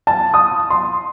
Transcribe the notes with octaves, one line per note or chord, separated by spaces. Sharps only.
A5
D#6
C6